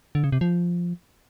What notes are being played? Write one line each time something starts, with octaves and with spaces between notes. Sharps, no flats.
D3
C#3
C3
F3